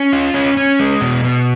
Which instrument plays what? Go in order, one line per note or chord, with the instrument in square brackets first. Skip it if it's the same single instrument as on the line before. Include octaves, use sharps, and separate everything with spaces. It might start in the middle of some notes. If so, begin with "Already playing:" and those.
Already playing: [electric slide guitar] C#4
F4
C#4
C#4
G#3
B2
B2